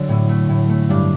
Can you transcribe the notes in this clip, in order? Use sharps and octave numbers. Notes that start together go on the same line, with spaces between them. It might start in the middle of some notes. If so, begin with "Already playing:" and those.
Already playing: D3 F#3 D4
A2
A3
A2
A3
G2 D4